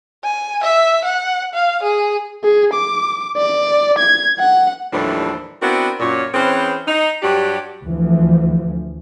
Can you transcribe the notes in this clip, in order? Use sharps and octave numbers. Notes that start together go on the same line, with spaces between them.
G#5
E5
F#5
F5
G#4
G#4
D6
D5
G#6
F#5
D#2 A2 E3 F3 G3 D4
B3 C4 D4 E4 F#4 A#4
F#2 A#2 C#5
E3 C4 C#4 G#4 B4 C5
D#4
G2 F#3 D4 G4
D2 E3 F3